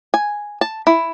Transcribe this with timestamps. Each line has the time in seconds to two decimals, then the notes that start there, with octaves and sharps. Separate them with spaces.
0.14 G#5
0.61 A5
0.87 E4